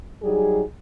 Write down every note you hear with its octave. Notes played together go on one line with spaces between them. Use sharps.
F#3 G3 D#4 G#4